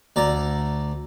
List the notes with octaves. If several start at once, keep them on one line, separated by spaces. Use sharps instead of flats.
D2 D5 A#5